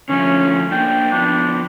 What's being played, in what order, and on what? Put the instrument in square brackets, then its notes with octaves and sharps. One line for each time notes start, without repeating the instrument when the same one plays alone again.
[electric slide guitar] D3 F3 A3 [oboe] C#4
[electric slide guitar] A#3 D4 [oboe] G5
[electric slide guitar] F3 B3 [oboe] D4